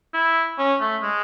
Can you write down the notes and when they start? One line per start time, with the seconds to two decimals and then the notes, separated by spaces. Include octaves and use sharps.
0.14 E4
0.58 C#4
0.81 A3
1.03 G#3